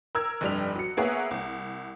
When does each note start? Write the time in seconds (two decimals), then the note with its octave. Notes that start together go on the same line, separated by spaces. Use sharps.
0.15 A#4 E6 G#6
0.41 F1 G2 G3 F7
0.76 F#3 C#7
0.97 A#3 B3 G#4 C#5 E5 F#5
1.31 C2